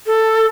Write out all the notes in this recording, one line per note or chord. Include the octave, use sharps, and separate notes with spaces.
A4